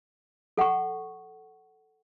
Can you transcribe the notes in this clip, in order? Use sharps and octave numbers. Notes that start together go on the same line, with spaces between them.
A4 F#5 C#6